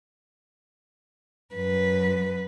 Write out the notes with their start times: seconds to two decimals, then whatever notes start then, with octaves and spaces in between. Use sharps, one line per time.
1.55 F#2 B4